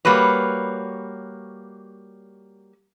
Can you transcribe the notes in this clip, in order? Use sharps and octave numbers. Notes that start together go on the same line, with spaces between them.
G3 A#3 F#4 B4 C#5